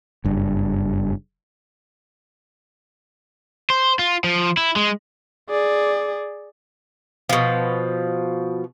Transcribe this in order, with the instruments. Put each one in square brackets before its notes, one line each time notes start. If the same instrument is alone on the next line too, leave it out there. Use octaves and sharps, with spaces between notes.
[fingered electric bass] F#1 G2
[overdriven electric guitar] C5
F4
F3
E4
G#3
[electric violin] G#4 D5
[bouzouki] B2 F3